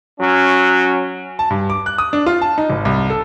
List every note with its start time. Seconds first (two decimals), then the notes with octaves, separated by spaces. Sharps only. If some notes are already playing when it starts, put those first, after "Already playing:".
0.20 F#3 C#4
1.39 A5
1.50 G2
1.70 D6
1.86 F#6
1.98 D#6
2.13 D4
2.26 F4
2.42 A5
2.58 D#4
2.70 G#1
2.85 C2
3.10 A4